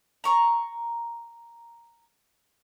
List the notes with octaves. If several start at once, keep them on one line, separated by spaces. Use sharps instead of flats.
A#5 C#6